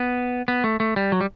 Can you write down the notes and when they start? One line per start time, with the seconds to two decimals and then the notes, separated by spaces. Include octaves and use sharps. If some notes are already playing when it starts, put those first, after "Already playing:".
Already playing: B3
0.48 B3
0.64 A3
0.80 A3
0.96 G3
1.12 F#3
1.21 G3